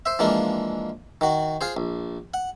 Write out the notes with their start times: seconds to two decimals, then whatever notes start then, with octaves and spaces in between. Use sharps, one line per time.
0.06 C5 E5
0.19 E3 F3 G#3 A#3 D4
1.21 D#3 F#4
1.61 F4 G#4 C5
1.77 A#1
2.34 F#5